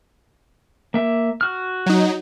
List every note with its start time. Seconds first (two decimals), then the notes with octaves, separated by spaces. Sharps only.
0.94 A#3 E5
1.41 F#4 F6
1.86 F#3 D#4